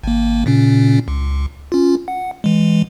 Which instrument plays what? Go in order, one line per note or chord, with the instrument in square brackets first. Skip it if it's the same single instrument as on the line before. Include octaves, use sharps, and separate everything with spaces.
[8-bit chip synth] G#1 A#3
A#2 C#3 C#4
C#2
C#4 F4
F#5
E3 G#3